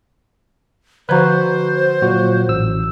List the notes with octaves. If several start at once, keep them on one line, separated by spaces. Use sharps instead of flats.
D3 F3 F#4 B4 C5 A#5
A#2 F#3 F#4
A1 E6